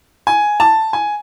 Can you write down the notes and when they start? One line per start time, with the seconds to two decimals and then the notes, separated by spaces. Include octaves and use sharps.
0.27 G#5
0.60 A5
0.93 G#5